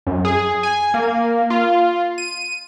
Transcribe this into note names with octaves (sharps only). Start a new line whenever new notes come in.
F#2
G#4
G#5
A#3
F4
D#7